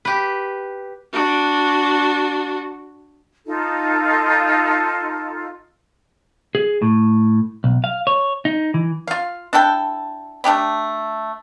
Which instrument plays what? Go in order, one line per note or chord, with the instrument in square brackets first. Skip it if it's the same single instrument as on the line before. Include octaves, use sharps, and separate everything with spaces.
[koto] G4 B4
[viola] D4 F#4
[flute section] D#4 F4 A4
[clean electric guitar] G#4
A2
B1
F5
C#5
D#4
E3
[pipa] F4 F5
D4 E4 A4 G5
A3 D4 G4 B5